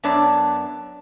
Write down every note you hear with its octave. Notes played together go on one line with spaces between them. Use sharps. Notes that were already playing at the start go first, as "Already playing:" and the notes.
F#2 B3 D4 C#5